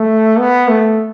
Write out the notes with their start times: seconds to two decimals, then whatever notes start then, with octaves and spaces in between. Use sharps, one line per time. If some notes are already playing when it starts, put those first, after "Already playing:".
Already playing: A3
0.38 B3
0.69 A3